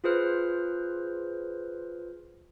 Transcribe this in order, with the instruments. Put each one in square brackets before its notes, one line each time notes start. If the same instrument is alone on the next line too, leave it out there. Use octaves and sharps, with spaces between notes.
[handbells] F4 G#4 B4 C5 F6